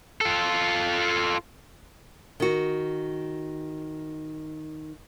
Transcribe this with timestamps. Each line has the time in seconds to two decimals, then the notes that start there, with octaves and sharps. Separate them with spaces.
0.21 F4 A4
2.40 D#3 F#4